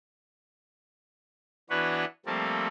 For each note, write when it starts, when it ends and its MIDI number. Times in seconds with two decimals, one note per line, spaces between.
1.70 2.05 52
1.70 2.05 59
1.70 2.05 62
1.70 2.05 66
1.70 2.05 71
1.70 2.05 73
2.26 2.68 53
2.26 2.68 55
2.26 2.68 57
2.26 2.68 58
2.26 2.68 60
2.26 2.68 69